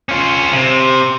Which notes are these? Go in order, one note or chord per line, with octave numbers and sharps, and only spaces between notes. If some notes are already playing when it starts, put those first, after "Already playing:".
C#4 F4
C3